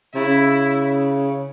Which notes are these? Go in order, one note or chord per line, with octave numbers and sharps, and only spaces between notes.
C#3 E4